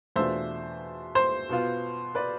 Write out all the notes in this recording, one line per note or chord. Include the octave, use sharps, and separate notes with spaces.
E2 B2 A3 D4 F4 C5 E5
C5
B2 B3 F4
B4 D5